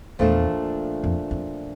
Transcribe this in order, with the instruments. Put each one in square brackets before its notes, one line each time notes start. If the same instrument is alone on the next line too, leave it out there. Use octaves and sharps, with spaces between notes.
[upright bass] E2 [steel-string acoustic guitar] A#2 F3 A3 D4
[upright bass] F2
F2